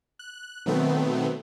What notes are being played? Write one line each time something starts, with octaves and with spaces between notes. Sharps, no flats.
F#6
B2 D#3 F#3 A3 B3 C4